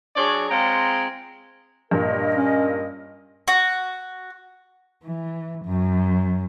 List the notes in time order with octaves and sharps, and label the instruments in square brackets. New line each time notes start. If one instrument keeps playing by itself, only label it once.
[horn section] F#3 D4 G#4 C#5 D5
G#3 C4 F4 G5 A#5
[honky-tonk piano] G2 A#2 [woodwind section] A#4 D#5
[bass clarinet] C#4
[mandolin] F#4
[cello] E3
F#2